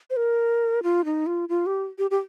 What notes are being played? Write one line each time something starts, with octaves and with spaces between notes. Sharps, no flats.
C5
A#4
F4
D#4
F4
F4
G4
G4
G4